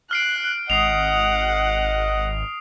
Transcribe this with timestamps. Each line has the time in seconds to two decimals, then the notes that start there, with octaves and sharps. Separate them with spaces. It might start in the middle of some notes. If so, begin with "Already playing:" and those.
0.11 F6 F#6 C7 D7
0.70 G#1 D#5 F#5 D#6 C7 F7